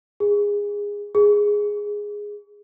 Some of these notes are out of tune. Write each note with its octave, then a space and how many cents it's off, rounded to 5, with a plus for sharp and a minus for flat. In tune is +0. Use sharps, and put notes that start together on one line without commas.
G#4 -20
G#4 -5